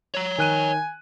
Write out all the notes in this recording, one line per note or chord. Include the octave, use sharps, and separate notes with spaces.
C#5 A#5
D#3 G#5 F#6 D#7